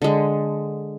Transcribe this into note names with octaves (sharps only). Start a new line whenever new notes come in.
D3 G#3